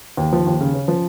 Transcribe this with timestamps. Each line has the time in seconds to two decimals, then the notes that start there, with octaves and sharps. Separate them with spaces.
0.17 D#2
0.32 F3
0.47 D#2
0.61 C#3
0.74 C#4
0.88 F3